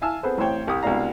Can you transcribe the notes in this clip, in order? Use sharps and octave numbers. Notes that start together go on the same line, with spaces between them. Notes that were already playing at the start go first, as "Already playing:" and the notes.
E5 F5 G#5 A5 E6 F6
B3 C4 G#4 A4 B4 C5
A1 A2 C4 C5 C#5 G5
C2 G4 D#6
C2 B2 G#3 D4 F5 A#5